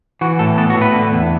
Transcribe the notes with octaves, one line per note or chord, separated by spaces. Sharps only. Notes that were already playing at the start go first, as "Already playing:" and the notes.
E3 F#4
A2 A4
B3 A4
F#4
A2
B4
D3
E2